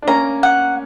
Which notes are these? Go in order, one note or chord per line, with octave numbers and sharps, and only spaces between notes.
D4
A#3 C#4 A#5
F#5